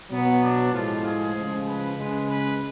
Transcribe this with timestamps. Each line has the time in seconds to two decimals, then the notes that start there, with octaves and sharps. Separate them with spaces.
0.11 B2 F#3 B3
0.42 D4
0.73 A2 F3 G#3 F4
1.03 G#4
1.34 C#3 F3 G#3
1.66 B4
1.96 C#3 G#3
2.27 B4